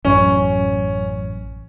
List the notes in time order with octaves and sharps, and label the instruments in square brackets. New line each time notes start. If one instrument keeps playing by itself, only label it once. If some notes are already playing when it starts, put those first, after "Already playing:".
[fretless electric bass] A1 F#2 [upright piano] C#4